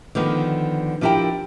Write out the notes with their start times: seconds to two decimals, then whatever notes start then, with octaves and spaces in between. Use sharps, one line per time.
0.15 D3 D#3 F3 B3
1.01 F3 D4 E4 G4 A#4 G5